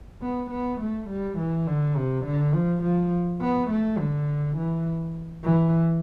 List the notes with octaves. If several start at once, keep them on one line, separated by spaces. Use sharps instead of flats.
B3
B3
A3
G3
E3
D3
C3
D3
F3
F3
B3
A3
D3
E3
E3